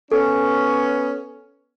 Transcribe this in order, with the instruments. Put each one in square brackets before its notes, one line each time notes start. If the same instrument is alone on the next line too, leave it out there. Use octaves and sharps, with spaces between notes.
[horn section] B3 C#4 [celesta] A4